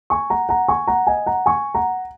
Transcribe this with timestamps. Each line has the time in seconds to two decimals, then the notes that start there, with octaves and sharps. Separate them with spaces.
0.10 G#5 C#6
0.30 F#5 A#5
0.49 F#5 A#5
0.68 G#5 C#6
0.87 F#5 A#5
1.07 D#5 G#5
1.26 F#5 A#5
1.46 G#5 C#6
1.75 F#5 A#5